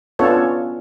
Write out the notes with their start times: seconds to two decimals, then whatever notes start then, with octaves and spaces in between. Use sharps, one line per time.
0.19 B3 C#4 D4 F4 A4 C#5